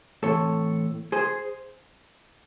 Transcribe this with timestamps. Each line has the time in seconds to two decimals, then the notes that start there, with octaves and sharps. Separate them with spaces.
0.23 A2 E3 C4 A4 C#5
1.12 G#4 C5